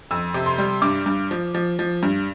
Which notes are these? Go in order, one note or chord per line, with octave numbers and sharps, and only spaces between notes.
F2 E6
C3
C6
G3
G2 D6
G2
F3
F3
F3
G2